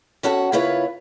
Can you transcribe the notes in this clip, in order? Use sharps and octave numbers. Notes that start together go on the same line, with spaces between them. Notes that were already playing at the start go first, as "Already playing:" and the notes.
B2 C#4 F#4 A4 F#5
C#3 A#3 E4 F4 B4 C#5